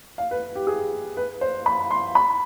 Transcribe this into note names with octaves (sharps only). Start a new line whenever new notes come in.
F5
B4
G4
G#4
B4
C5
B5
C6
B5